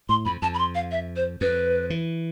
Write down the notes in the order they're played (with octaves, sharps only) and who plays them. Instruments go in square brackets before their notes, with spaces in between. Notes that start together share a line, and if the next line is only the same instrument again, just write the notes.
[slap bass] A2 [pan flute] C6
[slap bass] F2 [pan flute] B5
[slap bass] F2 [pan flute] A5
[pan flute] B5
C6
F5
E5
C5
[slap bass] F2 [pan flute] B4
[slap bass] E3